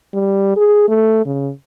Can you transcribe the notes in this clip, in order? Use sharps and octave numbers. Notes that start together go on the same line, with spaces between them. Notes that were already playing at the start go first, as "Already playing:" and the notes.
G3
G#4
A3
C#3